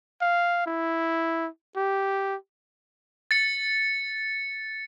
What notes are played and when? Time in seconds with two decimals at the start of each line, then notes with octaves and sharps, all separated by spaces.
0.22 F5
0.66 E4
1.76 G4
3.31 A6 C#7